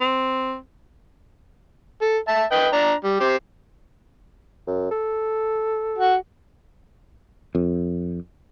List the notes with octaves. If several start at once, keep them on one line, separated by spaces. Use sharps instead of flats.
C4
A4
E5 A5
B4 D#5 G5
D4 A#5
G3
C4 G4
F#2
A4
F#4
F2